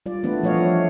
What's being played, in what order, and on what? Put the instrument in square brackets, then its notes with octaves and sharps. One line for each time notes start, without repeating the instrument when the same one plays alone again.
[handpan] G3 F4 D5
E3 A3 B3 D4 B4
F3 A3 C#5 D#5 F5